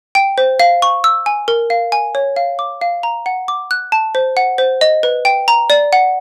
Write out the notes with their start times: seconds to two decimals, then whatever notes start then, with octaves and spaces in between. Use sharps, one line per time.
0.15 G5
0.38 C5
0.60 F5
0.82 C#6
1.04 E6
1.26 G#5
1.48 A#4
1.70 F5
1.92 G#5
2.15 C#5
2.36 F5
2.59 D6
2.81 F5
3.03 A#5
3.26 F#5
3.48 D6
3.71 F#6
3.92 A5
4.15 C5
4.37 F#5
4.58 C5
4.81 D#5
5.03 B4
5.25 G5
5.48 A#5
5.70 D5
5.93 F#5